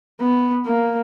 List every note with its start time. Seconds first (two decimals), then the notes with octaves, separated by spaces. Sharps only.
0.21 B3
0.66 A#3